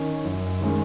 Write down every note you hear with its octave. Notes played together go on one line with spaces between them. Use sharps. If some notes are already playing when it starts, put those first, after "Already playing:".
Already playing: D#3 C#4
F#2
D#3 G#3 C#4